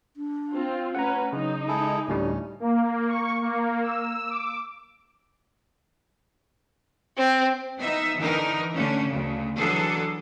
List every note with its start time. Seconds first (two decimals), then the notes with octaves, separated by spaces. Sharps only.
0.16 D4
0.54 C4 F4
0.95 A3 C#4 B4 F#5 A#5
1.33 C#3 F#3 D#4
1.68 G#3 E4 G#4 A4
2.08 D2 A2 G3 C#4 D4
2.60 A#3
3.09 C#6
3.42 A#3
3.82 E6
4.30 D6
7.18 C4
7.81 B3 D#4 E5
8.17 D3 E3 D#4 A#4
8.75 D3 A3 C#4
9.10 D2 C#3
9.57 D3 E3 F#3 D4 G#4 A4